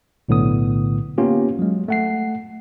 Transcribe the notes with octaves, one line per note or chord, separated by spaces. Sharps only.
B1 A2 D3 B3 D#6
A#3 B3 C#4 F4 G4
F#3 G#3
A3 F#5 C7